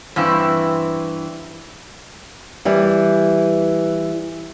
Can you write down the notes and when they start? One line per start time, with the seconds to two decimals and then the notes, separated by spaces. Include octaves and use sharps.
0.16 G2 E3 C4 E4
2.65 E3 G3